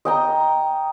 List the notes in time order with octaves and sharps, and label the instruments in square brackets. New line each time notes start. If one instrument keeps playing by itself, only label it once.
[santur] D#5 G5 A#5